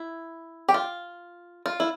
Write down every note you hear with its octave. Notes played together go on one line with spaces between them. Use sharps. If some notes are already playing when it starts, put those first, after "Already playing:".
Already playing: E4
G4
F4
F4
E4